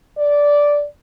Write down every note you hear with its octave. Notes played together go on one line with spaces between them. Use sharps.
D5